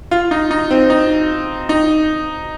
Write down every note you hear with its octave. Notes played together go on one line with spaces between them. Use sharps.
F4
D#4
D#4
C4
D#4
D#4